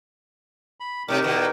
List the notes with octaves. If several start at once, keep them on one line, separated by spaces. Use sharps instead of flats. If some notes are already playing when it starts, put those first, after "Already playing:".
B5
A2 C3 G#3 D#4 G4 A#4
E2 B2